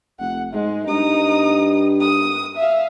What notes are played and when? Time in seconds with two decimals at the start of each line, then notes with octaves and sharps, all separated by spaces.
0.20 F1 F#5
0.53 G#2 G#3
0.87 G2 D#4 D#6
2.01 D#6
2.57 E5 F5